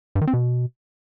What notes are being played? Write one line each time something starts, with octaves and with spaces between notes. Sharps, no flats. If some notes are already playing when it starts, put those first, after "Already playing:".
G2
D#3
C4
B2